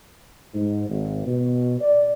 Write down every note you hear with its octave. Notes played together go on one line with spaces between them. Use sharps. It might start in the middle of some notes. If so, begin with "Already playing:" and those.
G#2
G#1
B2
D5